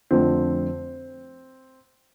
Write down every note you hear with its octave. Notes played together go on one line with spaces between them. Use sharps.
F2 D3 F3 A3 C4